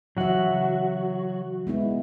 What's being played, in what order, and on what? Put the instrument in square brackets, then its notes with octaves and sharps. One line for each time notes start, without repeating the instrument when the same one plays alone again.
[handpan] C#3 E3 E5 [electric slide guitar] F#3 F#4
[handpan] G#3 B3 E4